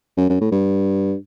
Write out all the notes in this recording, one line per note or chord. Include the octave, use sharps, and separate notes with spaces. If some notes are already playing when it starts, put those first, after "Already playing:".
F#2
F#2
A2
G2